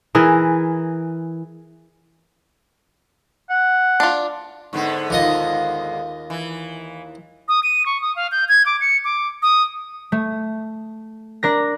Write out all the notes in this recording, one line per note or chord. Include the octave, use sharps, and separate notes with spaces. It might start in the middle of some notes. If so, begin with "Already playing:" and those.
E3 G#4 A#4
F#5
D4 F4
G#2 D3 B3
D#2 F4 D#5
E3
D#6
D#7
C#6
D#6
F5
G6
G#6
D6
C#7
D6
D#6
A3
D4 A#4 A#6